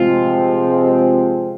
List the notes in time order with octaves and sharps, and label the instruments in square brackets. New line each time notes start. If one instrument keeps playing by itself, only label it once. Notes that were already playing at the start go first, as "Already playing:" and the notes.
Already playing: [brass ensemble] C3 F3 G#3 C4 [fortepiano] F4